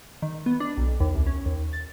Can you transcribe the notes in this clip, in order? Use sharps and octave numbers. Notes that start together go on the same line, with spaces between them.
D#3
B3
D4
B1
D#2
C2
C#4
D#2
A6